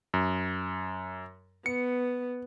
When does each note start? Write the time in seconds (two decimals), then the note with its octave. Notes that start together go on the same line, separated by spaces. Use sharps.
0.14 F#2
1.66 B3 C#7